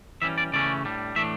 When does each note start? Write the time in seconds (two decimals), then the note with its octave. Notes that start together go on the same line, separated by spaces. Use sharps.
0.22 E3 G3 C#4 E5
0.38 D5
0.53 C#3 E3 A3 C#4 D5
0.84 A2 G3 D4
1.16 A2 E3 A3 D4 E5